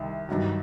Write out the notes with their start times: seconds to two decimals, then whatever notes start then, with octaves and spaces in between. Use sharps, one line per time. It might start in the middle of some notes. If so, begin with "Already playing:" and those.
Already playing: C2 C3 D#3
0.29 G2 D#3 F#3